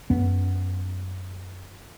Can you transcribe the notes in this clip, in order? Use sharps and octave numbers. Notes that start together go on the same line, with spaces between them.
F#2 B3